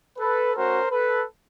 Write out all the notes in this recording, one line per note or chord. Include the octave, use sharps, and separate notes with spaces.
A4 B4
A3 C#4 F#4 A#4 C5
A4 B4